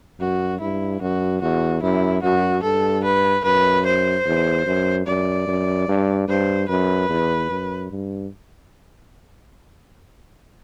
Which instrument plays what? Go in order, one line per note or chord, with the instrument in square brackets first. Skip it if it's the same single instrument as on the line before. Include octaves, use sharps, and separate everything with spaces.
[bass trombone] F#2 [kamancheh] F#4
[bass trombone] G2 [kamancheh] E4
[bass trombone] F#2 [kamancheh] F#4
[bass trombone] E2 [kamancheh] F#4
[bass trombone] F#2 [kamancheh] E4
[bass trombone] F#2 [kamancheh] F#4
[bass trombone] G2 [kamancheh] A4
[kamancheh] B4
[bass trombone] F#2 [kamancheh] B4
[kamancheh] C5
[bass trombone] E2
F#2
[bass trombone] F#2 [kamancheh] D5
[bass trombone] F#2
G2
[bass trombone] G2 [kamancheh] C5
[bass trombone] F#2 [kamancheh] B4
[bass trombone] E2
F#2
G2